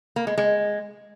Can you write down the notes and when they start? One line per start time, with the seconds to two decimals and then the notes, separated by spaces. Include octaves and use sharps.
0.16 A#3
0.27 G#3
0.38 G#3